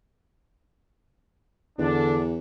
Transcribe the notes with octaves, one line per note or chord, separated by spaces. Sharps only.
E2 D3 D4